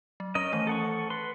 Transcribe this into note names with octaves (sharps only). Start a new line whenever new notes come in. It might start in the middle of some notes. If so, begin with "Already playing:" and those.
F#3
C#4 A#4 D#5 D#6
D#3 E3 A3
A4 F#5 C#6
B4 C6